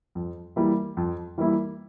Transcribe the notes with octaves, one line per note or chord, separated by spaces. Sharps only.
F2
E3 G3 A#3 E4
F2
E3 G3 A#3 E4